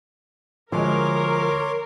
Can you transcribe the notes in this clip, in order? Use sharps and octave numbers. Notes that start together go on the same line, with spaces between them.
D2 F3 G#3 A#4 C#5 D#5 C6 D6